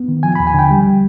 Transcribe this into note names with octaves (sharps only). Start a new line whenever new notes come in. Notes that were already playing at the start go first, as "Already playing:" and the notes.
Already playing: B3
D#3
F3 G#5
B5
D#2
G#5
D3 G5
G3